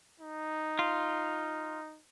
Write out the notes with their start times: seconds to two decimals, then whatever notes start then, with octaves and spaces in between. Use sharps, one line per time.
0.20 D#4
0.79 F4